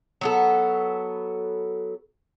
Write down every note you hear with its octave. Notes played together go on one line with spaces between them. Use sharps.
F#3 B3 A4